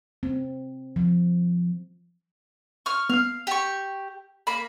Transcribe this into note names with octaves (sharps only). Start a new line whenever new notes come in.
C4
F3
C#6 F6
B3 F5 F6
G4 C#6
A#3 B5